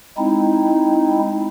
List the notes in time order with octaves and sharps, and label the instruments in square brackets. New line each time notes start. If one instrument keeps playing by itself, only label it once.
[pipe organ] G#3 C4 D#4 E4